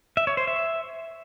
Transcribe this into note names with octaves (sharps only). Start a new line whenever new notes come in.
E5
C#5
C5
E5